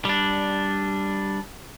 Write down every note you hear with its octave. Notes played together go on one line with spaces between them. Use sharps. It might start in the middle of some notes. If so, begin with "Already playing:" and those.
G3 D4